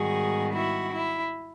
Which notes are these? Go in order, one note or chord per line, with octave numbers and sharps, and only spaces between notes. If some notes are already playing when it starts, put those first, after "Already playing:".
Already playing: G#2 D#3 G3 B3 F#4 G#4
E4 F#4
E4